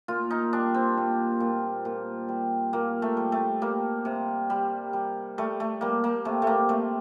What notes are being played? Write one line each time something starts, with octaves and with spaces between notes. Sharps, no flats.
A#2 F4
D#4
G3 D4
C4
A#2
A#2
A#2
G3
A#2 A#3
A3
G3
A3
G3 A#3
C3
G3
G3
G3 A3
A3
G3 A#3
A#3
C3 A3
A3 A#3
C3 A3